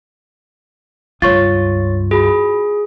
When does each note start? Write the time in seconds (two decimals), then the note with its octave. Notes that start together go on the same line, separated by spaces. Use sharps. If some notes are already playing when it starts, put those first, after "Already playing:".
1.22 C#2 G2 F4 C#5 C#6 A6
2.11 F#4 G#4 B5